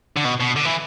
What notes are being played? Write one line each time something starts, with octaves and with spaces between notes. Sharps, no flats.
D3
B2
B2
D3
E3